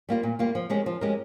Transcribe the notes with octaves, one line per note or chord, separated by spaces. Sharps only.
G3 A#3 F4
A#2
G3 A#3 F4
F3
G#3 C#4 G4 A#4
F3
G#3 C#4 G4 A#4